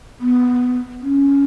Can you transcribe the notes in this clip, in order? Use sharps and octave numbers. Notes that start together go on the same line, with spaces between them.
B3
C#4